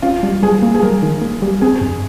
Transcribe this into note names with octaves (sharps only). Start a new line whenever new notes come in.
C#4 F4
G3
G3 G#4
A#3
G#4
G3 A#4
D#3
A#3
G3
C4 G#4
G2